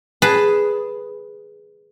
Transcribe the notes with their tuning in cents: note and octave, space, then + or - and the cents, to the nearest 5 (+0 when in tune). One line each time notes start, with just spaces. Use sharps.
G#4 +0 B4 +0 A5 +0